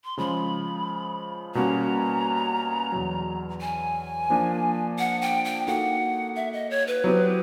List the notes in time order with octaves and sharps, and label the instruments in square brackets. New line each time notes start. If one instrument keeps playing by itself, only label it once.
[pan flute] C6
[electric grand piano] C#3 F3 G#3 [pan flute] B5
[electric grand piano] B2 G3 A#3 C#4 F#4 [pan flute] A#5
[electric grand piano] E2 B2 F#3
[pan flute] G#5
[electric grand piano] F3 A#3 D4
[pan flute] F#5
G5
G5
[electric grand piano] A#3 D#4 F#4 A4 [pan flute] F#5
[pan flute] E5
D#5
C#5
B4
[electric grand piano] F#3 B3 E4 G4 C5